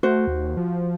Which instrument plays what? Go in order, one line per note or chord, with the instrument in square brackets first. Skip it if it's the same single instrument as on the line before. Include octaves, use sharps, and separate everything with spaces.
[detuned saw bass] A3 [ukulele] F#4 C5
[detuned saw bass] D#2
F3